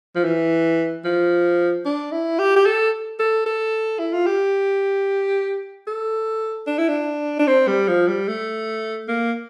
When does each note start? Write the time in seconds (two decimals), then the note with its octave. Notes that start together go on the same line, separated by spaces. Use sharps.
0.15 F3
0.24 E3
1.05 F3
1.85 D4
2.12 E4
2.39 G4
2.56 G4
2.66 A4
3.19 A4
3.46 A4
3.99 E4
4.13 F4
4.26 G4
5.87 A4
6.67 D4
6.78 E4
6.88 D4
7.39 D4
7.47 C4
7.68 G3
7.88 F3
8.08 G3
8.28 A3
9.08 A#3